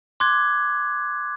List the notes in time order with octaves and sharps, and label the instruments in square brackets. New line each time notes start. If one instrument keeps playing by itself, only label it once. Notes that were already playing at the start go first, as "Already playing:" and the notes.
[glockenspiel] C6 D6 F#6 G#6